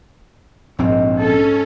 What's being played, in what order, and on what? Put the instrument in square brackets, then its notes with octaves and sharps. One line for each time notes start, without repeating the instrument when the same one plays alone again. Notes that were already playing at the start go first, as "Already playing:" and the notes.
[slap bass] A#1 C4 [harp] G#2
[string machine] C#4 [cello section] A4